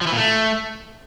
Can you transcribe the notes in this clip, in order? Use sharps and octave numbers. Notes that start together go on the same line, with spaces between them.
F3
E3
A#2
A3